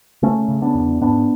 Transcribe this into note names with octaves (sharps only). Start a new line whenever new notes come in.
C#3 A3 C#4
C#3
B3 D4
E2
G#2 B3 D4